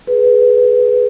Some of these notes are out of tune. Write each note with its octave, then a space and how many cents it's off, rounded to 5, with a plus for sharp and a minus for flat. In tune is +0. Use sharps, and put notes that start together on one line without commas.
G#4 +15 B4 +0